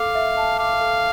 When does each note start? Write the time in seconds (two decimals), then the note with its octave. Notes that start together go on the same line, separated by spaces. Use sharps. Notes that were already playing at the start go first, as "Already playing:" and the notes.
Already playing: A4 F5 D6
0.15 E5
0.37 A5
0.59 F5 D6
0.81 A4